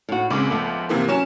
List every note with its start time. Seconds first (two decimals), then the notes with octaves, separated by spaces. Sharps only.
0.09 A2 F#4
0.30 C#2 C#3 G#3 C4 D6
0.50 F3 A3 B3
0.89 C3 E3 A#3
1.08 F#3 C#4 E7